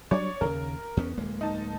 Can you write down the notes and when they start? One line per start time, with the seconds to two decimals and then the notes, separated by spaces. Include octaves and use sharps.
0.11 F#3 G3 D4 C#5 D5
0.41 D#2 C#3 A#4
0.97 E2 B3 C#4
1.17 D1 G#3 A#3
1.41 D#4 A5